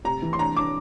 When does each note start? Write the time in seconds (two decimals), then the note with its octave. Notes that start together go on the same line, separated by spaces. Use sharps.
0.04 C3 A#5
0.22 E3
0.33 C6
0.39 D4 A#5
0.57 D4 D6